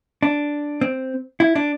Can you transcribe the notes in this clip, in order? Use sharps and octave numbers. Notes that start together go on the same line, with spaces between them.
D4
C4
E4
D4